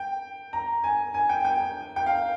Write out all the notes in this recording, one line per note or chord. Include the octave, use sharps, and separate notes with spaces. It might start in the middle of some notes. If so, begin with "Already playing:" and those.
Already playing: G5
A#5
G#5
G#5
G5
G5
G5
F5